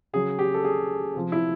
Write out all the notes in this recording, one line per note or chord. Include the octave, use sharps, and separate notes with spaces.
C#3 F#3 G#4
G4
A4
G#4
C3 F3
E4